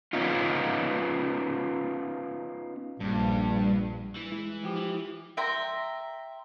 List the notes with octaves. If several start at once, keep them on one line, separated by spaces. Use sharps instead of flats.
B3 C#4 D#4 F4
A#1 G2
E3
G#3 E4
F3 G4
E3
E5 G5 A#5 C6